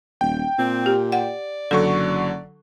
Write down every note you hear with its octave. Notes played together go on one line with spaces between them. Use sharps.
D#1 G5
A#2 C4
G4
D5 F#5
F#1 D3 F#3 A4 C#6